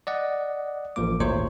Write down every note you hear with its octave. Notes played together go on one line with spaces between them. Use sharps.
D5 D#5 F#5
A1 F3 A#3 D6
G#1 D2 A#2 C5 C#5 C#6